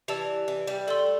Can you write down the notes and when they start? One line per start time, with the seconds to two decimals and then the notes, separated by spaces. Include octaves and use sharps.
0.08 E3 G4 D5 A5 E6
0.48 E3
0.67 G3
0.87 A3 A4 D5 C6 E6